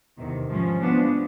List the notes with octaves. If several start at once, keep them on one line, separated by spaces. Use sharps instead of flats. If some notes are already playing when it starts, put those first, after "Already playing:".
E2 C3 D#3
G#2 F3 G#3 C#4
F3 G#3 B3 D4